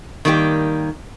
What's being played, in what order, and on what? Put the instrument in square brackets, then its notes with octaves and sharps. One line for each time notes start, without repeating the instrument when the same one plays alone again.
[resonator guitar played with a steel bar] D#3 G3 A#3 E4 G4